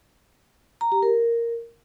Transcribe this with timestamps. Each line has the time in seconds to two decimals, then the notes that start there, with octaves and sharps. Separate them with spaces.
0.81 A#5
0.92 G4
1.03 A#4